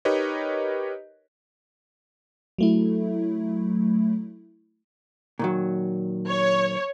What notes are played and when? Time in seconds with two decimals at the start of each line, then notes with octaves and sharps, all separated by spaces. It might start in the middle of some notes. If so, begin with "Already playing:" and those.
0.05 D#4 G4 A#4 B4 C#5 D#5
2.58 F#3 A3 E4
5.39 A#2 D#3 F#3
6.28 C#5